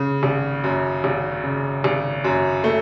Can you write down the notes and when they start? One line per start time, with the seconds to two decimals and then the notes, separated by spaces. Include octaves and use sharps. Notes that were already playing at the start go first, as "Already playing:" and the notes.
Already playing: C#3
0.23 G#1
0.64 F#2
1.04 G#1
1.44 C#3
1.84 G#1
2.24 F#2
2.64 A3